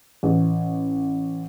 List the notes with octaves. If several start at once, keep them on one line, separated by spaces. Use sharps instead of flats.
A1